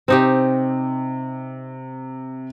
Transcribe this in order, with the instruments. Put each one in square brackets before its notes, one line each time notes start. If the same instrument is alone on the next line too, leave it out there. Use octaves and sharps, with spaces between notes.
[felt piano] C3 [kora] C4 D#4 G4